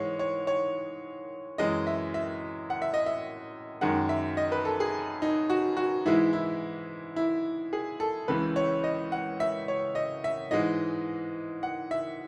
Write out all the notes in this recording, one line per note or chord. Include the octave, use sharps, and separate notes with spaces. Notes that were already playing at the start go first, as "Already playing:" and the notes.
Already playing: G#2 E3 G#3 C#5
C#5
C#5
F#2 E3 G#3 D#5
E5
E5
F#5
E5
D#5
E5
F#2 D#3 G#3 F#5
E5
D#5
B4
A4
G#4
D#4
F#4
F#4
G#2 E3 G#3 E4
E4
E4
G#4
A4
C#2 C#3 E3 B4
C#5
D#5
F#5
E5
C#5
D#5
E5
G#2 E3 G#3 D#5
F#5
E5